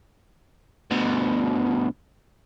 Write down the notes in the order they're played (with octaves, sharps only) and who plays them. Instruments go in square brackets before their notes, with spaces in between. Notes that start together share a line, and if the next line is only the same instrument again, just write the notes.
[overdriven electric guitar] D2 B2